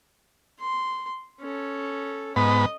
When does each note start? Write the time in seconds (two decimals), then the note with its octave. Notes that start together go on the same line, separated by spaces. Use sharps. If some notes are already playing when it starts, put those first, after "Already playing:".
0.59 C6
1.41 C#4 A4
2.36 G#2 B3 D#5 B5